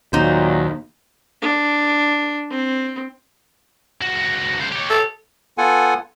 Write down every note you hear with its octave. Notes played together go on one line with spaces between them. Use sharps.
D#2 A#2 F#3 D#4 C5
D4
C4
C#2 F#4
C#2 C5
G4 C#5
A4
B3 F4 A4 F#5 G#5